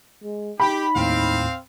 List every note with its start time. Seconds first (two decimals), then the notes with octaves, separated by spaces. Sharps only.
0.24 G#3
0.60 D#4 G4 B5
0.95 D#2 A2 C4 F5